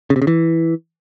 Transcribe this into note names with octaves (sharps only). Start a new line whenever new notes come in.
C#3
C3
C#3
E3